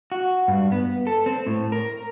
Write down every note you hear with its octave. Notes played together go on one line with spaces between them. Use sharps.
F#4
G2
B3
A4
C4
A2
A#4